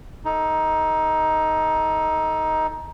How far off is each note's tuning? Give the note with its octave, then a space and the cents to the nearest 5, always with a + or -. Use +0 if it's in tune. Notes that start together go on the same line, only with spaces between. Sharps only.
D#4 +15 A4 +0